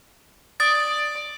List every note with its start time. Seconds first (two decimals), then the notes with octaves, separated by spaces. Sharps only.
0.60 D5 D#6 A6